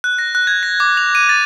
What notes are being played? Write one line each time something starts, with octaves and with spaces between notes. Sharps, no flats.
F#6
A#6
F#6
G#6
A#6
D6
F7
D#7
A6